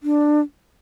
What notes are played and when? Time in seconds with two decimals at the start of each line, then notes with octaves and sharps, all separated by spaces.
0.03 D4